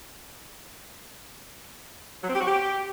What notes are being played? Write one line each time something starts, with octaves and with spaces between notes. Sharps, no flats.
F#3
C4
G4
F#4
G4